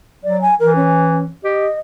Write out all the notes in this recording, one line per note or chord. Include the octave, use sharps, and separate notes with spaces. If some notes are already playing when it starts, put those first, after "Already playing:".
F#3 D5
G#5
E3 A#4
C#4
G4 D#5